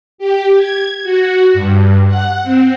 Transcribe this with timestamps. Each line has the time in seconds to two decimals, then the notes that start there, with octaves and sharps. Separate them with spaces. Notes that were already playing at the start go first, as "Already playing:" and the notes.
0.18 G4
0.56 G#6
1.03 F#4
1.54 G2
2.07 F#5
2.43 C4